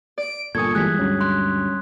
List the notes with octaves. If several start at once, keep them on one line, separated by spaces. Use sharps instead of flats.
D5 D7
G1 A#2 A4 G#5 C#6 D#6 G#6
E3 G3 G#3 F#6 G#6 B6
D2 G2 F#3 C#4
C6 F#6